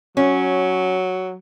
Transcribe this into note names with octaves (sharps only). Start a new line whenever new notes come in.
F#3 C#4